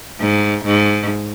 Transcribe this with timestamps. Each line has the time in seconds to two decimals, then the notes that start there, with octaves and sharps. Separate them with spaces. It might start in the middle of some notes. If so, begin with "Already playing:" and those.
0.20 G#2
0.65 G#2